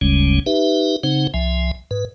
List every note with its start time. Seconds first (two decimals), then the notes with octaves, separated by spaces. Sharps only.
0.01 F#1 D2 C#3 G3 G#3 C#4
0.46 D#4 G4 B4 E5
1.03 C#3 C4 D#4 C5 F#5
1.34 C2 F3 E5 G#5
1.91 G#2 B4